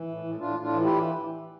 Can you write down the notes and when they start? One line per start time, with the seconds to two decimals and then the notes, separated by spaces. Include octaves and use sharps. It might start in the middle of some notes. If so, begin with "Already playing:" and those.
Already playing: E3
0.09 A2
0.24 A2
0.40 A2 D4 F4
0.56 A2
0.62 D4 F4
0.73 E3
0.83 E4 G4